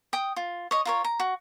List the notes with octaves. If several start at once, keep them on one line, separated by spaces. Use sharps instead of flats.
G5 D#6
F4
C#5 D#5
F4 A#4 C#5
A#5
F#4